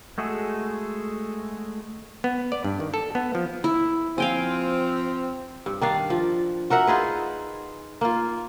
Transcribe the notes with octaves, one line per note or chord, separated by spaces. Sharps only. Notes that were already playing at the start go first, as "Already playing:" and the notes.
G#3 A3 F#4 G#4 A4
B3
D5
G2
D#3
A4
B3
F3
E4
F3 C4 F5 G5 G#5
G2
D#3 D4 F5
F3
F#4 A#4 E5 F#5
D#4 F4 G#4 B4
A#3 F4